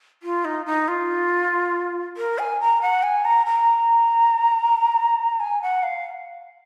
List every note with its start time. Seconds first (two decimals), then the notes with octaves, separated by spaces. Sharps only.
0.23 F4
0.45 D#4
0.66 D#4
0.88 F4
2.17 A#4
2.39 G#5
2.61 A#5
2.82 F#5
3.03 G#5
3.25 A#5
3.46 A#5
5.40 G#5
5.62 F#5
5.83 F5